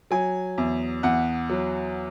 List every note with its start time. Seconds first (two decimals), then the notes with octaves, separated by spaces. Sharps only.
0.11 F#3 G#5
0.58 E2
1.03 E2 F#5
1.50 F#3